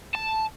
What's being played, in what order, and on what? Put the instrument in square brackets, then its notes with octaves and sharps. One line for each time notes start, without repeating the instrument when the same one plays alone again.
[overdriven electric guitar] A5